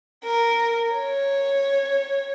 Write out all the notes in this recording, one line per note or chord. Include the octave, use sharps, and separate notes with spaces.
A#4
C#5